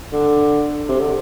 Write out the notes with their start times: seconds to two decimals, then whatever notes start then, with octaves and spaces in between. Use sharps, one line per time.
0.12 D3
0.89 C3
1.00 D3